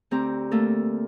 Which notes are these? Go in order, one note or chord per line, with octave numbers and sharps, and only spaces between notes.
D2 C4 G4 A#5
A3 A#3 A4 A#4